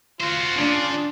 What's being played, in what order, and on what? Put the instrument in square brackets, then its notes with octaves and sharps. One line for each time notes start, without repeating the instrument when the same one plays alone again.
[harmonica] F4 [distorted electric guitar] F#4 C5
[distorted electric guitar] C#3 [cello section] D4